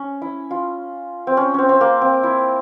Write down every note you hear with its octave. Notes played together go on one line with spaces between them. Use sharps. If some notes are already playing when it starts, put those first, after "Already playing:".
Already playing: C#4
E4
F4
C4
C#4
C4 C#4
C4
A#3
C4
E4